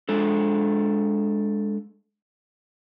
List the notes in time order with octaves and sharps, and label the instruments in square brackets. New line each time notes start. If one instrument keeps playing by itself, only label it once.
[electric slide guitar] G#3 D4 A4